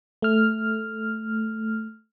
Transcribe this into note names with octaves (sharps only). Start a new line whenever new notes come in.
A3 F6